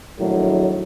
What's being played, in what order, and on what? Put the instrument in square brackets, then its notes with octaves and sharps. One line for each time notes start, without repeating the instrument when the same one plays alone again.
[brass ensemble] A#1 A2 D#3 F#3